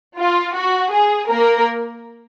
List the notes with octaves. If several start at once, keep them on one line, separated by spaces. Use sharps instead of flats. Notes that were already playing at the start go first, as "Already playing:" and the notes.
F4
F#4
G#4
A#3 A#4